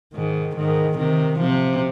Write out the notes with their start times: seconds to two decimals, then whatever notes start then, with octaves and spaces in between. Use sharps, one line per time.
0.14 G#2 D#3
0.57 G#2 D#3
0.98 C3 D#3
1.40 C3 F3